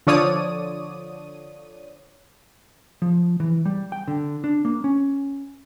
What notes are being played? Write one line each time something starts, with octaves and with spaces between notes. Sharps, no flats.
D3 F3 C#5 D5 D#6 D#7
F3
E3
G3
G5
D3
D4
A#3
C#4